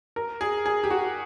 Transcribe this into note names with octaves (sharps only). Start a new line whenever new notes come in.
A#4
G#4
G#4
G4
F#4